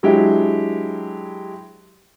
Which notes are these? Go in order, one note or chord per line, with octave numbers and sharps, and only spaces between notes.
F#3 G#3 D4 E4 G4